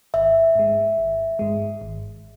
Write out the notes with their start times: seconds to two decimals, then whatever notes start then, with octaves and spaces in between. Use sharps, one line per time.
0.14 G#1 E5
0.55 G#2 G#3
0.98 G#1
1.39 G#2 G#3
1.81 G#1